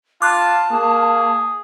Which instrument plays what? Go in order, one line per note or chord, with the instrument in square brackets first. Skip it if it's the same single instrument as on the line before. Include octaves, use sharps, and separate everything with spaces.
[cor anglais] F4 [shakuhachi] A5 [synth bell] D6 F#6
[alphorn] A#3 [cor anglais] G#4